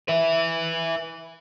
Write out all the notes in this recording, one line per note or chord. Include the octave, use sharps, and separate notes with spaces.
B4 E5